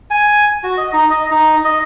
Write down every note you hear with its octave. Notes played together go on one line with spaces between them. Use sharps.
G#5
F#4
D#5
D#4
D#5
D#4
D#5